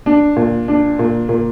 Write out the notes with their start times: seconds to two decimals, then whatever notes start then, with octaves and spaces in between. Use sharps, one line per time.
0.06 D4
0.36 A#2
0.68 D4
0.99 A#2
1.29 A#2